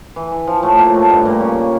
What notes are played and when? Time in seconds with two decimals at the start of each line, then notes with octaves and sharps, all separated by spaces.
0.16 E3
0.32 E3
0.47 F3
0.63 A2 A3
0.78 A#2 A#3
0.94 A2 A3
1.10 G2 G3
1.25 A#2 A#3
1.41 C#3 C#4